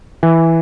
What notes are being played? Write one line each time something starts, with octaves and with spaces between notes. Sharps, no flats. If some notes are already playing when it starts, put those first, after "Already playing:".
E3